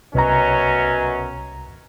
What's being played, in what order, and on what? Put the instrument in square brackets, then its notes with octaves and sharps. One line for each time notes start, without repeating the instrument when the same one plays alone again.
[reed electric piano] C2 A#5 [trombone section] F#2 F#3 C#4 [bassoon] B2